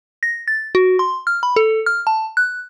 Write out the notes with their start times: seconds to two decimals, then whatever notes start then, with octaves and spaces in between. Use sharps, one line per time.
0.23 A#6
0.48 A6
0.75 F#4
0.99 C6
1.27 F6
1.43 B5
1.56 A4
1.86 F6
2.07 A5
2.37 F#6